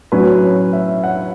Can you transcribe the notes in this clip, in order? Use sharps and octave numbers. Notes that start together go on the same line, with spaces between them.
A2 F#3 C#4 B4
C#5
E5
F#5